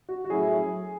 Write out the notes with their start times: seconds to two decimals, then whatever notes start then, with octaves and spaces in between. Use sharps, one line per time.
0.09 F#4
0.25 F#4
0.30 A2 F#3 C#4 E4 G#4